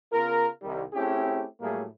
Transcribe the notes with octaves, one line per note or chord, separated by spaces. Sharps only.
C#3 B3 F4 A#4
C2 D#3 G3
A3 C4 C#4 E4 G4 G#4
A2 F#3 G3 A3 A#3 G#4